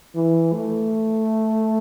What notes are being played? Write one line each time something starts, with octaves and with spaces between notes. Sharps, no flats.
E3
A3